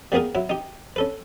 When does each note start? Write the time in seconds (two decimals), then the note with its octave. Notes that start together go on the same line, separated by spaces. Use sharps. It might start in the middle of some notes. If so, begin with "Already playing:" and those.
0.12 G3 A#3 B3 G#4 A#4
0.35 F#3 E4
0.49 D#4 G4
0.96 C#4 A4 B4